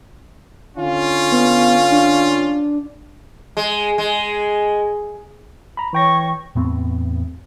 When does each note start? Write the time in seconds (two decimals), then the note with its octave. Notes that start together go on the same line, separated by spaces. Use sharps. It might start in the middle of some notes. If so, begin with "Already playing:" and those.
0.77 D3 C#4 F4
1.32 B3
1.92 D4
3.57 G#3
3.98 G#3
5.77 A#5 B5
5.93 E3 C#5 G5 C#6 A#6
6.55 E2 A2 B3 C4